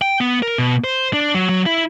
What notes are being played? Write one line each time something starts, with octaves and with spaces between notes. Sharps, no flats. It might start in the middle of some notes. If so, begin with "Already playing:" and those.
G5
B3
A#4
B2
C5
D4
F#3
F#3
E4